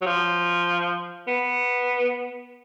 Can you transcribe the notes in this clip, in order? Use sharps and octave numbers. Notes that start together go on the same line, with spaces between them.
F#3
F3
B3